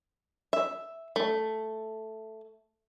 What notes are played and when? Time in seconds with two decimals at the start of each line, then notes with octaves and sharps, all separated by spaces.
0.53 E5
1.16 A3